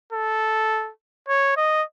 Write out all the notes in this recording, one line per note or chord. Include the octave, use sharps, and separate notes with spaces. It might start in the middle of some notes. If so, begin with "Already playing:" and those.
A4
C#5
D#5